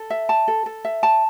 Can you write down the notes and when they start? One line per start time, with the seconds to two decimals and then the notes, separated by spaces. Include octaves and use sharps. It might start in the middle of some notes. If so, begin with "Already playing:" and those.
Already playing: A4
0.10 E5
0.29 A5
0.48 A4
0.66 A4
0.85 E5
1.03 A5